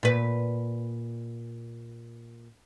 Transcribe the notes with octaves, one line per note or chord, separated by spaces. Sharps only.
A#2 B4